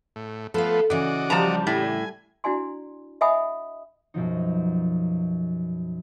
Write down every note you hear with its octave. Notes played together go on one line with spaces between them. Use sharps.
A2
F3 A3 B3 A4 F5
C#3 E3 F#4 D5 D#5
F3 G3 A5 A#5
A2 G#5
D4 E4 F#4 D5 G#5 C6
D#5 E5 F#5 G#5 B5 D#6
F#2 B2 F3 D#4